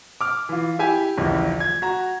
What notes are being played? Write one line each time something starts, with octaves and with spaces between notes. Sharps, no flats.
D6 F6
E3 F4
E4 G4 G#5
D#1 A#1 C#3 E3
G#6
F#4 A#5